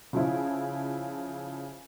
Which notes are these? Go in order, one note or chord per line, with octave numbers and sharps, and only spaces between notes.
C#3 F3 E4